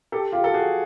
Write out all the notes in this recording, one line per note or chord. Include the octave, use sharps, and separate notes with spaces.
G4 A4
F4 G4
A4
F#4 G#4